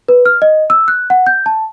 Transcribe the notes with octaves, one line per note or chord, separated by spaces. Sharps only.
B4
F6
D#5
E6
F#6
F#5
G6
A5